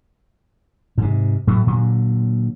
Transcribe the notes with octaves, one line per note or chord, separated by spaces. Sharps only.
G#2 C3
A2 F#3 A3
A#2 D3 F#3